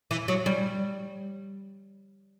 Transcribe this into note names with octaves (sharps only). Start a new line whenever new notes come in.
E3
F#3
G3